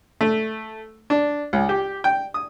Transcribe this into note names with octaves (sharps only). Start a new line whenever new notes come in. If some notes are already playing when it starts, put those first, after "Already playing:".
A3
D4
C#2
G4
G5
D#6